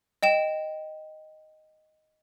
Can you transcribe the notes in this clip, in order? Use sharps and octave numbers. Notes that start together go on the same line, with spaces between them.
D#5 G5 E7